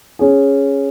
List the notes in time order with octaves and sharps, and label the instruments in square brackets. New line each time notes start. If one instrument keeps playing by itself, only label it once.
[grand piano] C#4 G#4